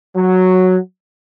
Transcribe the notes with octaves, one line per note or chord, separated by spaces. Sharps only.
F#3